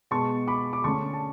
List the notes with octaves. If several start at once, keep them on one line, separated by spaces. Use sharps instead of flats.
B2 G#3 B3 A5 C#6
B5 D6
D6
D3 A3 C#4 A5 C#6
A5